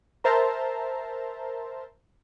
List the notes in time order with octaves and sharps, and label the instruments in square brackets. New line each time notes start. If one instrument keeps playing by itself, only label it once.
[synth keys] A#4 C5 E5 A5 A#5 C6